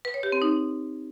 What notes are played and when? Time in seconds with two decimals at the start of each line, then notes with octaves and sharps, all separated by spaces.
0.05 B4
0.14 C#5
0.23 G4
0.32 C4
0.42 D#4